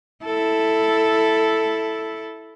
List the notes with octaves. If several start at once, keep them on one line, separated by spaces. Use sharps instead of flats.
E4 A4